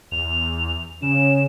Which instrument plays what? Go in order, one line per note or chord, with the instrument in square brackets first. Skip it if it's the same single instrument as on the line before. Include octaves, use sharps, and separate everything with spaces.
[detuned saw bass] E2 [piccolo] F7
[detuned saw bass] C#3 [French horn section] C#4 [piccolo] E7